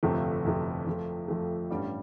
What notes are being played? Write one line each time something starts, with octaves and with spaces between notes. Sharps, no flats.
G1 F2 C3 F3 A3
G1 F2 C3 F3 A3
F2 F3 A3
F2 F3 A3
A1 G2 G3